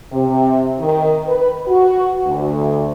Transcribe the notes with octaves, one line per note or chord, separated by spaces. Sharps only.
C3
D#3
B4
F#4
D2